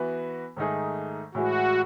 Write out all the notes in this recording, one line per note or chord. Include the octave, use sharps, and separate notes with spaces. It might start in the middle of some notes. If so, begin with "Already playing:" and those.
Already playing: E3 B3 F#4 B4
G#2 D#3 A3 D#4 G#4
A2 E3 G#3 F#4